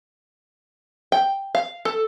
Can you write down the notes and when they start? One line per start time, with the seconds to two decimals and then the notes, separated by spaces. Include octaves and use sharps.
1.12 G5
1.55 F5
1.85 A4